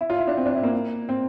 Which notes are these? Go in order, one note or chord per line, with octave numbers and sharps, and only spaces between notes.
E4
F4
E4
D4
C4
D4
E4
A#3
C4